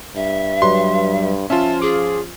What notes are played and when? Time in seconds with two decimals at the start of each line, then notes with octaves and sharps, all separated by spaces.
0.16 G2 E5
0.62 F#3 G3 B4 C6
1.50 F3 C#4 F4 E5 A5
1.82 G#4 D6